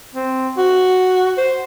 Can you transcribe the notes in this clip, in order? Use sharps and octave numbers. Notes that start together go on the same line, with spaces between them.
C4
F#4
C5